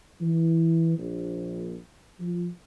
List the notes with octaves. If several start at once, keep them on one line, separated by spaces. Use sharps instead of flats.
E3
A#1
F3